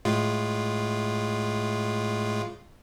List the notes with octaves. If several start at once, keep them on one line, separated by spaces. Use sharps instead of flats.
A2 G#3 F4